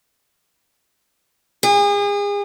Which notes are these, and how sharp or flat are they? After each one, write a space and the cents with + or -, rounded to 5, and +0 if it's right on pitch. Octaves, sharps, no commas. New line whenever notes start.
G#4 -35